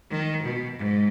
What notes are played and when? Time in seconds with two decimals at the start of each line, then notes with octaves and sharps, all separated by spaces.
0.10 D#3
0.44 B2
0.77 G#2